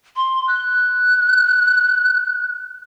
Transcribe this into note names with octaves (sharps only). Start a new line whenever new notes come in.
C6
F#6